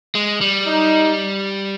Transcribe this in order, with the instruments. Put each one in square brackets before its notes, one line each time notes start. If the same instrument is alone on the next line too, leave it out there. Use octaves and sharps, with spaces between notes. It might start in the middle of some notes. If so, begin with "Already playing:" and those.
[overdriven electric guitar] G#3
G3
[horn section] D#4